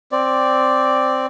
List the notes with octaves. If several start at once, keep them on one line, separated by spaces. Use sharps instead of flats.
C4 D5